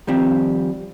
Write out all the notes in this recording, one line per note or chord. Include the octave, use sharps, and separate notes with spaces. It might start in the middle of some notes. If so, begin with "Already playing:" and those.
D#3 F3 G3 C4